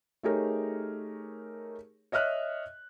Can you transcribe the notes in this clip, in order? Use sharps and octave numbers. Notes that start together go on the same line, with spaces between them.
A3 D#4 G4 G#4 A#4 C#5
C#5 D#5 E5 F6 F#6